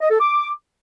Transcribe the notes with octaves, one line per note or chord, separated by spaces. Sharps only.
D#5
A4
D6